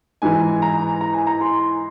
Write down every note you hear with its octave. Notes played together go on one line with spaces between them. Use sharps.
G#2 E3 G#5
A#5
A#5
G#5
A#5
C6